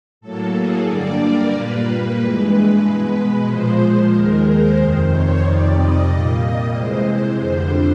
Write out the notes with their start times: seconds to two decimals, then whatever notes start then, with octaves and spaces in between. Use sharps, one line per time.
0.21 A2 F#3 A#3 A4
0.54 G#4
0.86 G2 D3 G3 A#3 D5
1.19 A#4
1.51 A#2 G3 A#3 B4
2.17 G2 E3 G#3 B4
2.81 B2 G#3
3.47 A#2 F3 G#3 C5
4.12 D#2 D#3 G#3 A#4
4.45 C5
4.77 F2 C3 D#3 C5
5.10 C#5
5.43 F2 C3 D#3 G3 D5
5.75 D#5
6.08 A#2 G3 A#3
6.73 C3 E3 G#3 C5
7.38 F2 D3 G3 C5